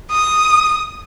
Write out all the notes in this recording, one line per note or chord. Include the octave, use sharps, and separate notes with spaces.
D#6